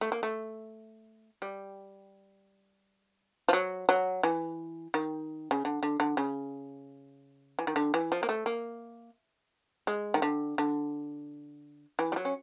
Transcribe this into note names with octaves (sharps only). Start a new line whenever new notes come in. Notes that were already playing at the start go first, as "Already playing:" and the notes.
A3
A#3
A3
G3
F3
F#3
F#3
E3
D#3
C#3
D3
D3
D3
C#3
E3
D#3
D3
E3
F3
A#3
A3
A#3
G#3
D#3
D3
D3
E3
G3
F#3
C#4